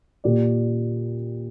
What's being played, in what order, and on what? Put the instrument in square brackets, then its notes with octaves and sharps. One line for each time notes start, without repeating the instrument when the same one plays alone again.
[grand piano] A#2 A#3 G4 D5